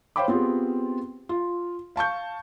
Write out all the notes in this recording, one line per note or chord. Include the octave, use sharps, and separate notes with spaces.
C5 C#5 F5 G5 B5 D6
B3 C4 F4 G4 G#4
F4
F5 A5 C#6 G6